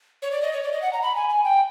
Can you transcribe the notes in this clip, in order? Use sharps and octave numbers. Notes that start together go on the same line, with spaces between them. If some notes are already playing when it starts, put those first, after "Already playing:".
C#5
D5
D#5
C#5
D5
D#5
F#5
A#5
B5
G#5
G#5
G5